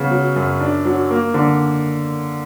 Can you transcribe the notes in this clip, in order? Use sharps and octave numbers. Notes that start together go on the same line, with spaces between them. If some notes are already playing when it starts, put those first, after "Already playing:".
Already playing: C#3 B3
F#3
F#2
D4
F#3
A#3
D3